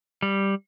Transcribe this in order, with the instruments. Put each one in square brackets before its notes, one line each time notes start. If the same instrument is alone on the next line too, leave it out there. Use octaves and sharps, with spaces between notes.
[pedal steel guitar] G3